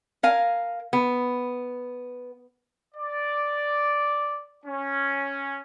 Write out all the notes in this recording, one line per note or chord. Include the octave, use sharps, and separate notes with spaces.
A#4 F5 G#5
B3
D5
C#4